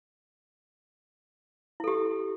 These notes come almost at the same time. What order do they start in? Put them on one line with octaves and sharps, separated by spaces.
E4 A4 G4